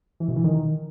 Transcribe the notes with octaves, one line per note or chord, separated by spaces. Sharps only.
E3
B2
E3
D#3